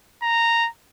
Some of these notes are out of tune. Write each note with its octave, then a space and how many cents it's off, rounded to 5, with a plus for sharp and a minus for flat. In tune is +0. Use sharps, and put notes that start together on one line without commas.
A#5 -10